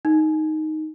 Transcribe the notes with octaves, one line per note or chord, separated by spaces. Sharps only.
D#4